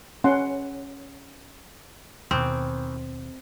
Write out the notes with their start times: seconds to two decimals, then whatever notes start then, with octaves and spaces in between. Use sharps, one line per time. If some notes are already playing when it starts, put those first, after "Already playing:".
0.24 C#4 F#5 C6
2.31 D#2 B2 D#3 E3 C4